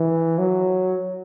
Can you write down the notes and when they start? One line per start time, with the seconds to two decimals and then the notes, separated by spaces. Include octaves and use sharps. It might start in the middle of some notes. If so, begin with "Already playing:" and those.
Already playing: E3
0.39 F#3